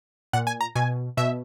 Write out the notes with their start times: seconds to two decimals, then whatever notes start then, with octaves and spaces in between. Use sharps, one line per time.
0.33 A#2 F#5
0.47 G#5
0.61 A#5
0.75 B2 G#5
1.17 B2 E5